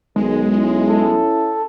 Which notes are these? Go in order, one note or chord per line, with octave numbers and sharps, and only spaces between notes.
B1 D#3 G#3
C#4 E4
A4